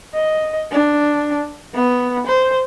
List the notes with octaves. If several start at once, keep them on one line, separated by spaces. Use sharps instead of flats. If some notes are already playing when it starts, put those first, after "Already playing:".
D#5
D4
B3
C5